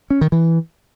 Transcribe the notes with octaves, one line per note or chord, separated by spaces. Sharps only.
C#4
D#3
E3